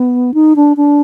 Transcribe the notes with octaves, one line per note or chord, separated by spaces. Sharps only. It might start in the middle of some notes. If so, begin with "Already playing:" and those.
Already playing: B3
D#4
D4
D4